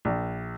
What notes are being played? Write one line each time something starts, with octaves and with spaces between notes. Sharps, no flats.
A#1